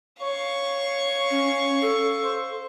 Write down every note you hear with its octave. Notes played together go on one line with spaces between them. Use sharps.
C#5 F5 C#6
C#4
A4
C5